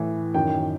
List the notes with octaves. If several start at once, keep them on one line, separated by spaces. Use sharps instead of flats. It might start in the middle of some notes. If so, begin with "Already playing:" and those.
Already playing: A2 E3
F#2 D#3 G5